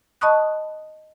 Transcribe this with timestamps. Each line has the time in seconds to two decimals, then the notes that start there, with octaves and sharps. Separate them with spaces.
0.21 D#5 A5 B5 C#6 D#6 F#6